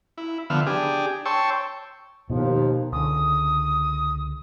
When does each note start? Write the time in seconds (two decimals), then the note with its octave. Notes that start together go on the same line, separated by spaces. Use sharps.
0.18 E4
0.50 D3 F3 B3 E5 F6
0.66 D4 G4 G#4
1.25 C#5 G5 A5 C6 C#6 E6
2.30 D#2 B2 D#3 F3
2.93 C#2 D3 D#6